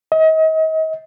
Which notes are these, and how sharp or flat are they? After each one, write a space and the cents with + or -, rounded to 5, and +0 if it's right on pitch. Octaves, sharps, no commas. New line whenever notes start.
D#5 +35